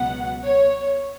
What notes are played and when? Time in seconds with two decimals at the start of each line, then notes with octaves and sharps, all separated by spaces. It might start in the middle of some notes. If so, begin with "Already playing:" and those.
Already playing: C#2 B2 F#3 B3 F#5
0.44 C#5